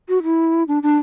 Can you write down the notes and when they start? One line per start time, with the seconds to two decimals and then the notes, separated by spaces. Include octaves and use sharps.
0.09 F#4
0.23 E4
0.68 D4
0.83 D4